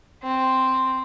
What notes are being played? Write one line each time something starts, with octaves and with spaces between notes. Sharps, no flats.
C4